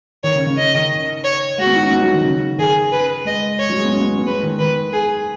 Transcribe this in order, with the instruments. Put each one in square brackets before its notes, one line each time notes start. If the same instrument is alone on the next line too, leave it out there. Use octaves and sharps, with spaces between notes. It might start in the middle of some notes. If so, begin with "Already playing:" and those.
[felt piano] D#3 [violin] C#5
[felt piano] C#3
C#3
[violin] D#5
[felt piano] D#3
[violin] C#5
[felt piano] G#3 [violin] F#4
[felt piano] B3
D#4
C#4
B3
F#3
D#3
C#3
[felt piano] D#3 [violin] G#4
[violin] B4
[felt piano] G#3 [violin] D#5
[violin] C#5
[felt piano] F#3
G#3
B3
C#4
B3
C#4
B3
[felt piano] G#3 [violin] B4
[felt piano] D#3
[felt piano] D#3 [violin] B4
[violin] G#4